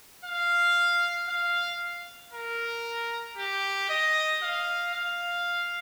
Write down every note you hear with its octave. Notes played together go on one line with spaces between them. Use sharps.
F5
F5
A#4
G4
D#5
F5
F5